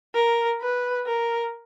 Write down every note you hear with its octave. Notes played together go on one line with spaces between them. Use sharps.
A#4
B4
A#4